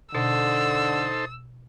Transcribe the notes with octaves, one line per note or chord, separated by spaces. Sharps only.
B2 D3 D#4 A4 C5 E6